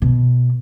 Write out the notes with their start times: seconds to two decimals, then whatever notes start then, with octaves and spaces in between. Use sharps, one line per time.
0.02 B2